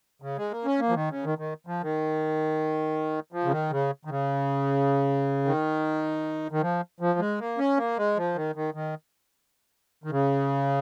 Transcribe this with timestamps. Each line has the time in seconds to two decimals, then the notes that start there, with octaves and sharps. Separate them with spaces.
0.22 C#3
0.37 G#3
0.51 A#3
0.65 C#4
0.80 A#3
0.89 F3
0.94 D#3
1.10 C#3
1.24 D#3
1.38 D#3
1.67 F3
1.82 D#3
3.32 F3
3.44 C#3
3.51 D#3
3.71 C#3
4.05 D#3
4.10 C#3
5.45 D#3
6.52 D#3
6.61 F3
7.00 F3
7.19 G#3
7.39 A#3
7.58 C#4
7.77 A#3
7.97 G#3
8.16 F3
8.35 D#3
8.56 D#3
8.74 D#3
10.04 D#3
10.11 C#3